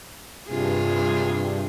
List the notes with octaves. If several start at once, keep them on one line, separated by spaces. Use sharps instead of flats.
G2 C3 F4 G#4